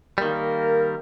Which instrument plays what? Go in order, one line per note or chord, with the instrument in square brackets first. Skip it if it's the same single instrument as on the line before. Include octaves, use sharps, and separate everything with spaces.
[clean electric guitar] D#3 G3 [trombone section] A#3 A#4